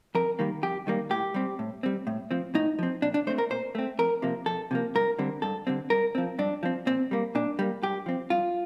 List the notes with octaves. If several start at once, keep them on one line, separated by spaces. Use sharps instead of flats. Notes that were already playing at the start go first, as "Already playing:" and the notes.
F2 A#4
D#3 G3 A#3
F2 G4
D#3 G3 A#3
A2 G4
G3 C4
A2
G3 C4
A2
F3 C4
A2 D#4
F3 C4
A#2 D4
D4
A3 C4 C5
A#4
A#2 C5
A3 C4
F2 A#4
C3 F3 A#3
F2 A4
C3 F3 A#3
G2 A#4
D3 G3 C4
G2 A4
D3 G3 C4
G2 A#4
F3 C4
G2 D4
F3 C4
A#2 C4
G3 A#3
A#2 D4
G3 A#3
G2 G4
F3 C4
G2 F4